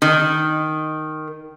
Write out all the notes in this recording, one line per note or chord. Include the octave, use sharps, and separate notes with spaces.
D#3